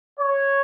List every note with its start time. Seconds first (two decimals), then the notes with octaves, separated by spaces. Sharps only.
0.18 C#5